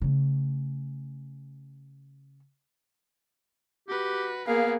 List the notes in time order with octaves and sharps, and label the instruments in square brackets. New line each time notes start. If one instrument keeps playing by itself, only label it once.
[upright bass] C#3 A3
[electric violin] F#4 B4 [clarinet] G4
[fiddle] A#3 [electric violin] B3 G#4 [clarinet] F5